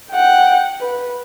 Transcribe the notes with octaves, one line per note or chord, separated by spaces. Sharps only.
F#5 G5
B4